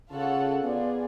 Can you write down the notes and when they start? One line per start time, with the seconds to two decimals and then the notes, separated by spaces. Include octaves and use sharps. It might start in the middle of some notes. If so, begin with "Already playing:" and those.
0.11 C#3 F4 A4 C#5 F#5
0.63 B3 F4 G#4 D5